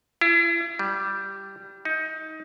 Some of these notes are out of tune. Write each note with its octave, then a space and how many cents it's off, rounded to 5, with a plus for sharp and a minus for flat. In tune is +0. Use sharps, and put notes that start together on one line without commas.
E4 +40
G3 -5
D#4 +20